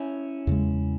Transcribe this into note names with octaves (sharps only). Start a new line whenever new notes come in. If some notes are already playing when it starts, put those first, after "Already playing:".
Already playing: C#4 E4
E2 C#3 G#3